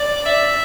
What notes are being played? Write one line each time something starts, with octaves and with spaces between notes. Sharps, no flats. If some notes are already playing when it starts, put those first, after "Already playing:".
Already playing: D5
E5